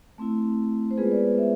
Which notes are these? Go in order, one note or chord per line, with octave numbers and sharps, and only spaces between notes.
A3 C4 E4
C5
G#3 B3 F4 G#4 B4
B4 D5
B4 D5
C5 E5